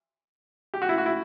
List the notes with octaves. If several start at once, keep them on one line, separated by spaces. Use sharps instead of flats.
G4
F#4
E4
F#4
E4